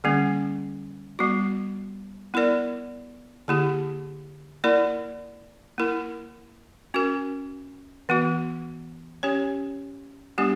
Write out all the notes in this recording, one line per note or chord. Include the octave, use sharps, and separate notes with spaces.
D3 G3 A#3 C#4
G3 B3 F#4
B3 E4 A#4 D5
D3 A#3 E4 G4
A#3 E4 A#4 D5
A#3 E4 A#4
C#4 F#4 A#4
E3 B3 F#4
C#4 G4 C#5
G3 B3 D4 G4